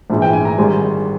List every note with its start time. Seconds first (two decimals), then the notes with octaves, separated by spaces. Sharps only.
0.10 A#1 G#2 E3
0.22 G5
0.33 G#5
0.45 A#5
0.58 G#1 G#2 G3 G#5